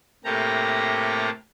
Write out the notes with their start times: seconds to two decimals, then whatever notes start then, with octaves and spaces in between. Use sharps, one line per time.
0.24 A2 C3 A#3 G4 A4 A#5